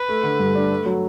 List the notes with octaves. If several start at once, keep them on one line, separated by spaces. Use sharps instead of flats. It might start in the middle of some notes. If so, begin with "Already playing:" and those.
Already playing: B4
A3
D3
G2
D4
A3
F#3